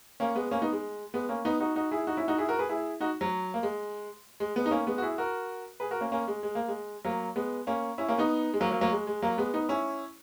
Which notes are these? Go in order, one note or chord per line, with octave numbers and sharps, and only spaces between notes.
A#3 C#4
G#3 B3
A#3 C#4
B3 D#4
G#3
G#3 B3
A#3 C#4
B3 D#4
D#4 F#4
D#4 F#4
E4 G#4
D#4 F#4
C#4 E4
D#4 F#4
E4 G#4
F#4 A#4
G#4 B4
E4 G#4
D#4 F#4
F#3
A#3
G#3
G#3
G#3 B3
D#4
A#3 C#4
G#3 B3
F#4
E4 G#4
F#4 A#4
G#4 B4
F#4 A#4
A#3 C#4
A#3 C#4
G#3
G#3
A#3
G#3
F#3 A#3
G#3 B3
A#3 C#4
C#4 E4
A#3 C#4
B3 D#4
G#3
F#3 A#3
F#3 A#3
F#3 A#3
G#3
G#3
F#3 A#3
G#3 B3
B3 D#4
C#4 E4